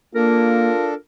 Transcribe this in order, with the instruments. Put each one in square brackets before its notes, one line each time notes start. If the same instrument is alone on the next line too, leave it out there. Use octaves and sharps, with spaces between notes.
[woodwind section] A#3 [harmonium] D4 A4 [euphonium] F4 [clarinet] A#4